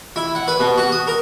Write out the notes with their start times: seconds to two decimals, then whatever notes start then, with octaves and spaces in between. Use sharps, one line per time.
0.16 E4
0.35 F#5
0.48 B4
0.60 B2
0.78 F#4
0.92 D#6
1.07 A#4